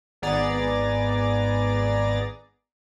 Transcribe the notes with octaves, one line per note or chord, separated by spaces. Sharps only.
G#1 B3 G#4 D5 A#5 A6